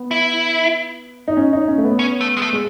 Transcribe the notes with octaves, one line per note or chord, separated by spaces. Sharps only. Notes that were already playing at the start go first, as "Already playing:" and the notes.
Already playing: B3
E4
D#4
C#4
D#4
C#4
A3
B3
C#4
A3
G#3
A3
G#3